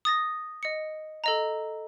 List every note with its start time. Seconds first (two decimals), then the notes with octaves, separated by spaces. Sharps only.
0.05 D#6 A6 A#6
0.63 D#5 C#7
1.24 A4 D#5 A#5